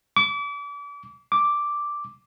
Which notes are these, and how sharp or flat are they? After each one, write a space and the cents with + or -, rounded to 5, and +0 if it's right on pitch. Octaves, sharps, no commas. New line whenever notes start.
D6 -35
D6 +0